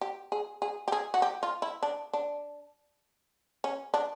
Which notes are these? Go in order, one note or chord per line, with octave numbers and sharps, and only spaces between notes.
G4
G#4
G#4
G4
G#4
F#4
G4
F4
E4
D4
D4
C#4
D4